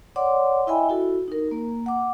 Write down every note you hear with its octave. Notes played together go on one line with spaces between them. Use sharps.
C#5 D5 F#5 C6 D6
E4 D#5 E5 G5 G#5 B5
E4 F#4 A4
D#4 A#4
A#3
F#5 D6